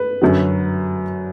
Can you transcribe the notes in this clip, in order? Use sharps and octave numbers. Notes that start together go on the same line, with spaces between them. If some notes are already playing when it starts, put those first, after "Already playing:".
Already playing: B4
F#2 D3 F#3